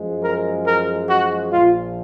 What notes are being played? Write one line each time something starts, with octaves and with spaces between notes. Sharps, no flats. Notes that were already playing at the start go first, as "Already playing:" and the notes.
Already playing: F#2 F3 G#3
A#4
A#4
F#4
A#1 A#2 F3 F4